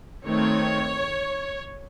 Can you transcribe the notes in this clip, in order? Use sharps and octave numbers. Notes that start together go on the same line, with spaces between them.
D#3 A3 C4 C#5